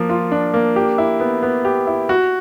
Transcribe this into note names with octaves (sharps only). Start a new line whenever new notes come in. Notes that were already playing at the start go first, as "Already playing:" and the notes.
Already playing: F3 A#3
F4
D4
A#3
G4
E4
B3
B3
G4
E4
F#4